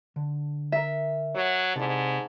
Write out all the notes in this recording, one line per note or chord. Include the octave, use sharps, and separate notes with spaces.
D3
A#4 E5
F#3 C#5
G#2 C3 A4 D5